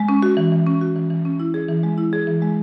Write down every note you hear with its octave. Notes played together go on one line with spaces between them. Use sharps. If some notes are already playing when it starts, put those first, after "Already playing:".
Already playing: G#3
C#4
F#4
E3
E3
C#4
F#4
E3
E3
C#4
E4
G#4
E3
G#3
E4
G#4
E3
G#3